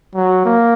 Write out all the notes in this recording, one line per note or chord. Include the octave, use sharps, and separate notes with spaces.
F#3
A#3